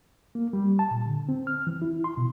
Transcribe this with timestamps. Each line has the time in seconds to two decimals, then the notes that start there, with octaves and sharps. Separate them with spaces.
0.35 A#3
0.53 G3
0.79 A5
0.91 A#2
1.06 D3
1.29 C4
1.47 F6
1.67 E3
1.82 E4
2.04 C6
2.17 B2